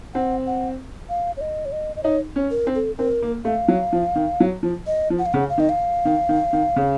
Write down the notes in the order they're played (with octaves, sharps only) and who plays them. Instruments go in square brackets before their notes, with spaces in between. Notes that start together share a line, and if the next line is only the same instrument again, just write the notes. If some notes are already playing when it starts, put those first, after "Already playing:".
[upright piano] C4 [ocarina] F#5
[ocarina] F#5
F5
C#5
D#5
C#5
D#5
D#5
[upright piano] D#4 [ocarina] C#5
[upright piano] C#4
[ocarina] A#4
[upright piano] C4
[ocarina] A4
[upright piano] C4 [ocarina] A#4
[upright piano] A#3
[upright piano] A3 [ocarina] F5
[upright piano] F#3
F3
D#3
F#3
F3
[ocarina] D#5
[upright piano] F3
[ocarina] F#5
F5
[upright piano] C#3 [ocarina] F#5
[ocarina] F5
[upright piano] D#3 [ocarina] D#5
[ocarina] F5
[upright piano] D#3
D#3
D#3
C#3